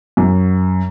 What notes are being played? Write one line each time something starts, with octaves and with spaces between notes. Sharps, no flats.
F#2